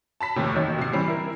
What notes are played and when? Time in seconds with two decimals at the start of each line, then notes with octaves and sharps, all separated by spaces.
0.21 A5 B5 B6
0.36 F1 D#2 A2 C3
0.54 A1 D#3 F#3
0.78 C3 C7
0.92 E3 G3 C4 C#4
1.08 E4 A#4